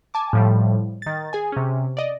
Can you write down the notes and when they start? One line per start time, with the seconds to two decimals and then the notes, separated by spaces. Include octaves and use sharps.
0.14 G#5 A5 D6
0.33 A2 F3 G3
1.02 D#3 A6
1.33 G#4 G#5
1.52 C3 C#4
1.97 D5 D#5